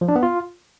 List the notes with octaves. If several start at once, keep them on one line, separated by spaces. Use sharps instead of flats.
F3
D4
B3
F4